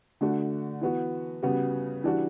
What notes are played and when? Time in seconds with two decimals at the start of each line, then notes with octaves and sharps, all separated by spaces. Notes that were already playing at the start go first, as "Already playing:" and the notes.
0.21 D3 A3 D4 F#4
0.81 E3 B3 F#4
1.43 C#3 G3 B3 F#4
2.04 E3 G3 D4 F#4